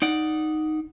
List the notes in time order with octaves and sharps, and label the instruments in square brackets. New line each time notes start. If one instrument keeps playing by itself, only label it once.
[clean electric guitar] D#4 D5 F#5